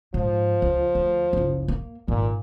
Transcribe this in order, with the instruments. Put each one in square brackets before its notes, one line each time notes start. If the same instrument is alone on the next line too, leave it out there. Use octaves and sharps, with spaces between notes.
[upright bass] G#2 [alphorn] F3
[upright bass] C#2
D2
F#1 C#2
A#3
[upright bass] G#1 D#3 [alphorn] A#2